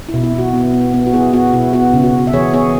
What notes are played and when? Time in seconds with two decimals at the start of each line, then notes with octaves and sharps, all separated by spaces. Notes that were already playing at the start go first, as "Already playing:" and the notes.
0.09 E4
0.14 B2
0.23 E4
0.33 B2
0.38 F#4
0.53 B3
0.74 B3
0.94 B3
1.07 F#4
1.13 B3 E4 G#4
1.33 B3 F#4
1.53 B2 E4
1.73 B3 F#4
1.94 C#3
2.03 F#4
2.14 C#3
2.27 E5
2.33 E3 G#4 C#5
2.53 B3 G#4 C#5